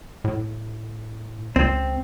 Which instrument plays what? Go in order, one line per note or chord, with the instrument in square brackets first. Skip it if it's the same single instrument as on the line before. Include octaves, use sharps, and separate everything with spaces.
[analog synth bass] A2
[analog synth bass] C#2 [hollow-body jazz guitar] C4